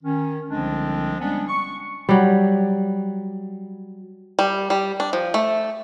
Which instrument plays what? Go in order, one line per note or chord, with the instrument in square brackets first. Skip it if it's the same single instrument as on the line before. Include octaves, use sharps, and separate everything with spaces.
[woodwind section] D#3 C#4
C2 D3 F3 G#3 C4 D4
G3 G#3 B3 C#4 D4
C#6
[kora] F#3 G3
[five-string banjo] G3
G3
D4
F3
A3